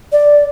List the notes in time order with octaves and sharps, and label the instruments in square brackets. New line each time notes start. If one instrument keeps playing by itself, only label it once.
[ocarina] D5